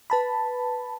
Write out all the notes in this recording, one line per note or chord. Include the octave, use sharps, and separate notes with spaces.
B4 A5 B5